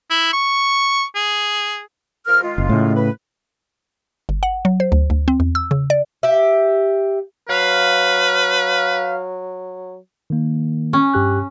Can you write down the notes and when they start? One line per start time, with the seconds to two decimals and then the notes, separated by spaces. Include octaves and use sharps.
0.10 E4
0.33 C#6
1.16 G#4
2.27 F3 A#4 F6
2.43 D#3 G#3 F4
2.58 F#1
2.69 A2 C#3
2.96 B4
4.29 G1
4.43 F#5
4.65 F#3
4.80 C5
4.92 D2
5.10 D2
5.28 C4
5.40 E2
5.55 E6
5.71 C#3
5.90 D5
6.23 G4 E5
7.49 F#3 B4 F5
10.30 D#3 A#3
10.93 C#4
11.14 G2 G4 F#6